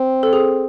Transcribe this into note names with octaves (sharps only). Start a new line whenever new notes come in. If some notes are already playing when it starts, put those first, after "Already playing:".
Already playing: C4
A4
G#4